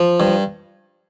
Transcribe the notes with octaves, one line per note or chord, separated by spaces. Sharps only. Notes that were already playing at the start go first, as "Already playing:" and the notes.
Already playing: F3
G2